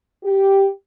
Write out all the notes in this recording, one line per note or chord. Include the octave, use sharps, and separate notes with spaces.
G4